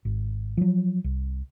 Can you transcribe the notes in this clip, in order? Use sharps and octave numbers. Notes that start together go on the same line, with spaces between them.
G#1
F3 F#3
C2